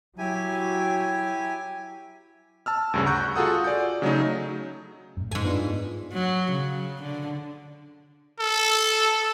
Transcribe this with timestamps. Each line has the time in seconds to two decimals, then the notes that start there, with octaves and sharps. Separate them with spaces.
0.18 F#3 E4 G4 G#5
2.66 A5 E6 F6
2.94 D2 G2 C#3
3.06 F#5 A#5 C#6 F#6 G6
3.36 F4 F#4 G#4 A4 F#5 D#6
3.64 D5 G#5 G6
4.02 C#3 F#3 A3 D#4
5.17 F#2 A2
5.31 G#2 A4 G#5
5.44 B3 D4 F4
6.12 F#3
6.52 C#3
7.02 D3
8.40 A4